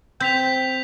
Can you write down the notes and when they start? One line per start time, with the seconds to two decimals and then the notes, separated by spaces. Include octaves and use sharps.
0.20 C4 G5 G6 B6 F7